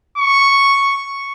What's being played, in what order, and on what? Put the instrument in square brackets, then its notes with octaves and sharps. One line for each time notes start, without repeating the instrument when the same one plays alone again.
[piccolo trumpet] C#6